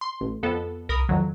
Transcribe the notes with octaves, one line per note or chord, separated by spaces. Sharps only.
C6
A1
F2 B3 A4
C2 A#4 B5 D#6
F2 D#3 F#3